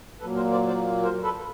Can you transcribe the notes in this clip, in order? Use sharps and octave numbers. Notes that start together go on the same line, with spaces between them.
A#2 F#3 A#3 A4 B4
A#4 C5
C5 D5
C5 D5
A#4 C5
A4 B4